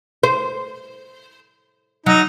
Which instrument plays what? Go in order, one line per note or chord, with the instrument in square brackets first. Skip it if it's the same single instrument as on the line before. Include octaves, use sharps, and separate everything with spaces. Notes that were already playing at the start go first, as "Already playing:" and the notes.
[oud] C5
[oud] F#3 [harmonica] D#4